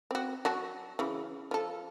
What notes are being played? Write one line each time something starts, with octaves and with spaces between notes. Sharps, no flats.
C4 F#4
F#3 F#4 A5
C#3 E3
F3 A4